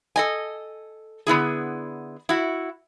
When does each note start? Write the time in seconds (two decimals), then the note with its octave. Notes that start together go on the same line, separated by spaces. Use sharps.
0.16 A4 D#5 G#5
1.27 D3 B3 E4 G#4
2.29 E4 F#4